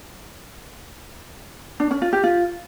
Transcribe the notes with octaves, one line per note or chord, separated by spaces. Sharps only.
D4
C#4
F4
G4
F4